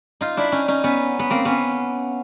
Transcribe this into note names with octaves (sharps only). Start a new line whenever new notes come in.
D#4 F4
D4 E4
C#4 D#4
C#4 D#4
B3 C#4
B3
A#3 C4
B3 C#4